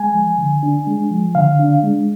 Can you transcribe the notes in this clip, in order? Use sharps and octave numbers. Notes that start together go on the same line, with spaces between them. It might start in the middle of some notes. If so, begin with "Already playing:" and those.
Already playing: G#3 G#5
F3
D3
D4
G#3
F3
D3 F5
D4
G#3